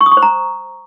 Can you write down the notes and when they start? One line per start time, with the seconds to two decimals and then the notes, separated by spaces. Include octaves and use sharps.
0.01 C#6
0.06 D#6
0.12 C#6
0.17 C5
0.22 A#5